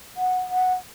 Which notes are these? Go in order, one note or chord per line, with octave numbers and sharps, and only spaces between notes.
F#5
F#5